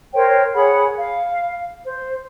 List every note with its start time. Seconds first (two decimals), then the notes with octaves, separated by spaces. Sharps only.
0.14 A#4 C5 C#5 G5
0.54 G#4 C#5 F#5 B5
0.97 F5
1.86 C5